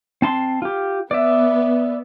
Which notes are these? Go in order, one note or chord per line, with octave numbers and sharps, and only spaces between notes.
C4 A5 C6
F4 G4
B3 D5 E5